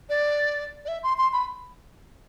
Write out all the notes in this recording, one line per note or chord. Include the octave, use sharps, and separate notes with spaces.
D5
D5
E5
C6
C6
B5